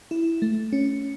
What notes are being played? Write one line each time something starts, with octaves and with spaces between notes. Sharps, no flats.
E4
A3
C#4